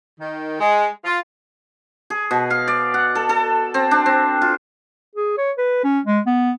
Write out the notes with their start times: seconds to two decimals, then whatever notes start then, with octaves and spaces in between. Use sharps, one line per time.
0.19 D#3
0.59 G#3
1.04 F4
2.10 G#4
2.31 B2
2.50 F5
2.68 D5
2.94 F#5
3.15 A4
3.29 A4
3.74 C4
3.91 D4
4.06 C4
4.42 F4
5.15 G#4
5.37 C#5
5.58 B4
5.83 C#4
6.05 G#3
6.26 B3